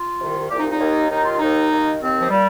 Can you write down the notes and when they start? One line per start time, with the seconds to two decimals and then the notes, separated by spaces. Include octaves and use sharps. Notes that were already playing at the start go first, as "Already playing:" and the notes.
Already playing: F4
0.19 C2 C3 D#3
0.49 C2 A#2 G4
0.59 D#4
0.70 D#4
0.79 D#2 D#3
1.09 D#2 D#3 D#4
1.24 F4
1.39 D#2 D#3 D#4
1.69 D#2 D#3
1.99 D#2 D#3 C4
2.20 F3
2.29 A#2 G3